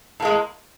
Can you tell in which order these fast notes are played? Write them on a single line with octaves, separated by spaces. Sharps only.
A2 A#3 G#3